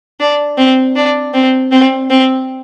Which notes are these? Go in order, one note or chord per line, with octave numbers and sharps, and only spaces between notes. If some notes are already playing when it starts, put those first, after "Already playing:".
D4
C4
D4
C4
C4
C4